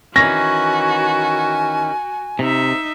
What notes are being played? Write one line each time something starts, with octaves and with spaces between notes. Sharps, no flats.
D#3 E3 C#4 F#4 G#5 A#6
C3 D#4 E5